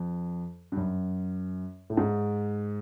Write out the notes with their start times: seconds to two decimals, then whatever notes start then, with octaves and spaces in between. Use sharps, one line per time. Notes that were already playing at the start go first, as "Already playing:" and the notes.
Already playing: F2
0.72 G2
0.77 F#2
1.90 A2
1.97 G#2